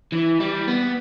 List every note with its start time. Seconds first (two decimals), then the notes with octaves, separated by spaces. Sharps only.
0.12 E3
0.40 G3
0.67 B3